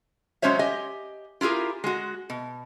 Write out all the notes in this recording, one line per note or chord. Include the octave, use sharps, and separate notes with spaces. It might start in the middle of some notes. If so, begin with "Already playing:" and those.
F#3 G#3 C#4 C5 C#5 E5
G4 D#5 G#5
E4 F4 G4 G#4 A#4
G#3 F#4
B2